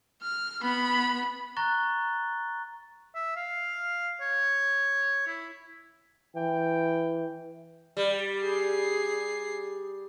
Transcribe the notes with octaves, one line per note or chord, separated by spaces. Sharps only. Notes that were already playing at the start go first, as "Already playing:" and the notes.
F6
B3 B5
A#5 C#6 F#6 A6 A#6 G7
E5
F5
C#5
E4
E3 G5
G3
G#4 C7